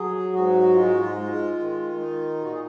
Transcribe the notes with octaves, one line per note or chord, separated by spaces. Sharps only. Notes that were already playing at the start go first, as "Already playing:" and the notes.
Already playing: F#3 G#4
G#2 F#4
G#3 F4
F#4
F4
G#3
D#3
D#4
A#2 F#4
G#4